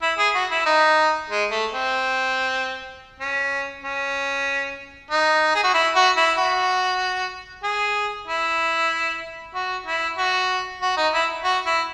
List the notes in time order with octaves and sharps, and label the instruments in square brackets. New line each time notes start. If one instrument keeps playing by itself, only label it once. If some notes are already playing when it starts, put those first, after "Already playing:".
[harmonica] E4
G#4
F#4
E4
D#4
G#3
A3
C4
C#4
C#4
D#4
G#4
F#4
E4
F#4
E4
F#4
G#4
E4
F#4
E4
F#4
F#4
D#4
E4
F#4
E4